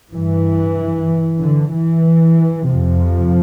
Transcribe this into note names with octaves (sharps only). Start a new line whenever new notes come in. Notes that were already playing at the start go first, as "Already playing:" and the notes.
G2 E3
D3
E3
F2 C3 F3